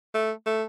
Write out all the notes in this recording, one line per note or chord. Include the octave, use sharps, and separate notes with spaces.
A3
A3